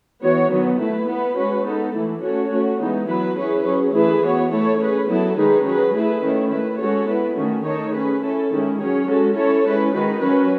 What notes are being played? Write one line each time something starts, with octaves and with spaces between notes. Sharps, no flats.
E3 B3 F#4 C#5
D#3 F#3 B3 F#4
A3 E4 B4
B3 E4 B4
G#3 C#4 F#4 B4
B3 D#4 A4
E3 A3 E4
A3 C#4 F#4 A4 C#5
A3 C#4 F#4
E3 G#3 B3 D#4
F#3 B3 E4 B4
C#4 E4 G#4 B4
F#3 C#4 G#4
E3 A3 E4 G#4 B4
E3 B3 F#4 C#5
A3 E4 A4 C#5
C#4 G#4 B4
F#3 B3 E4 A4
D#3 G#3 D#4 G#4 B4
F#3 C#4 G#4 B4
A3 E4 G#4 B4
D#3 A3 C#4 E4
A3 E4 B4
G#3 C#4 F#4 A4 C#5
B3 E4 B4
D#3 A3 C#4 F#4
D#3 A3 D#4 A4 C#5
C#4 G#4 B4
C#4 E4 A4
D#3 G#3 C#4 E4
F#3 C#4 G#4 C#5
G#3 C#4 F#4 A4
C#4 E4 A4 C#5
G#3 C#4 E4 B4
D#3 G#3 D#4 F#4 B4
F#3 C#4 F#4 B4